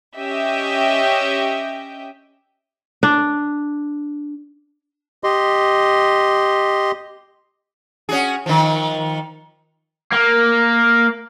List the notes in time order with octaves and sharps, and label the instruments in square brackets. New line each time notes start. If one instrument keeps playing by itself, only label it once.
[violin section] C#4 G4 D#5 E5 G5
[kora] D4
[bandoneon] G4 D#5 C6
[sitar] C#4 F#4 G#4
D#3 F3
[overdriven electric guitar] A#3